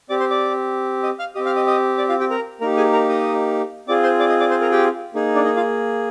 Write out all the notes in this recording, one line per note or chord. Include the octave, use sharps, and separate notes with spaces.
C4 G4 D5 D6
C5 C6
D5 D6
D#5 D#6
F5 F6
C4 G4 D#5 D#6
F5 F6
D#5 D#6
D#5 D#6
D5 D6
F4 F5
G4 G5
A#4 A#5
A#3 D#4 G4 A#4 A#5
G#4 G#5
A#4 A#5
D#5 D#6
C4 F4 G#4 D5 D6
C5 C6
D5 D6
D#5 D#6
D5 D6
C5 C6
A#4 A#5
G4 G5
A#3 D#4 G#4
D4 D5
D#4 D#5
F4 F5